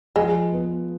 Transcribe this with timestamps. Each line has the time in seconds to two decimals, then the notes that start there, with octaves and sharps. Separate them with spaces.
0.16 F3 G#3
0.52 B3